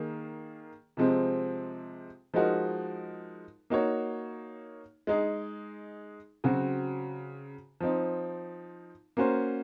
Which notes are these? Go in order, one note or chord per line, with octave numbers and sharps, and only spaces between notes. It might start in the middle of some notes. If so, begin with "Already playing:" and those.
Already playing: D#3 A#3 G#4
C3 F3 G#3 C4
F3 G#3 D#4 F#4 A#4
A#3 D#4 F#4 C#5
G#3 D#4 G#4
C#3 F#3 C4 F#4
F3 C4 D#4
A#3 C#4 F#4 C5